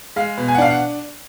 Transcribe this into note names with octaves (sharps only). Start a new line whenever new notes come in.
G#3 F5
B2
G#5
F#5
D4 F5
F#5